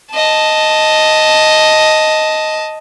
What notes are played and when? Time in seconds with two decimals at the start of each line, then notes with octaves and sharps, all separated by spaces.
0.12 D#5 A5